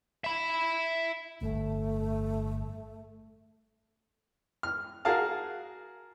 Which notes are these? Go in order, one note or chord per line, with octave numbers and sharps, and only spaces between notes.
E5 B5
G1 A2 A3
F6
F#4 G#4 A#4 F5 A5